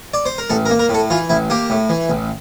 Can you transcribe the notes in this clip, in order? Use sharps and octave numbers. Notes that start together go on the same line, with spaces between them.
D5
C5
A#4
A1 A4
A#4
A#3
A#4
A2 A4
E3 F4
A1 E4
A#3 G4
A2
E3
A1